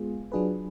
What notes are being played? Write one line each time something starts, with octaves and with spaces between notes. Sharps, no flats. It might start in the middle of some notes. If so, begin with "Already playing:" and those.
Already playing: G#3 B3 F4 G#4
F#3 D4 F4 G#4 B4